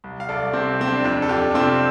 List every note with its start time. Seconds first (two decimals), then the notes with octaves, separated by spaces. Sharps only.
0.04 C2
0.20 F5
0.29 C2 A4 D5
0.53 C3 C4
0.79 C3 C4
0.87 D4
1.04 F2 D4
1.22 A4
1.29 F2 D4 G4
1.51 D4
1.54 C3 C4 F4